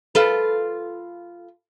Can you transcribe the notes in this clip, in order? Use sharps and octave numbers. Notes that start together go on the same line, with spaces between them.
F4 A4 B4